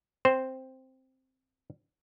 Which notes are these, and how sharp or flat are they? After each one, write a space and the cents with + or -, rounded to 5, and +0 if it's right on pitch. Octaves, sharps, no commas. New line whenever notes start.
C4 +0 C5 +0